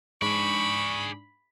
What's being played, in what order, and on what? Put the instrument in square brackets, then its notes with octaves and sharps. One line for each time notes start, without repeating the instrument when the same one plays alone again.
[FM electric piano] G#2 D4 [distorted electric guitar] G#4 D5 [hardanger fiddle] B5 [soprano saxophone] C#6